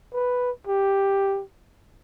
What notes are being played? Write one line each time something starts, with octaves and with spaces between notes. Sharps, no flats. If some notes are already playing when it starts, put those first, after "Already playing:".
B4
G4